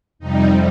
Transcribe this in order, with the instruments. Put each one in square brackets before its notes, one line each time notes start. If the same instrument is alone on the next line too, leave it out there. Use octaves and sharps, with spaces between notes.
[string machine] F2 C3 G3 D#4